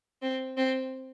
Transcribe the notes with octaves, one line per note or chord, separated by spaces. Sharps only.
C4
C4